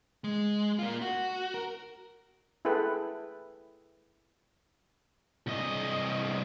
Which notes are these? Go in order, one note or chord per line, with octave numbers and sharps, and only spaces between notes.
G#3
A#3 F4
F#4
A#4
E4 G#4 A4 B4 G5
C2 D#5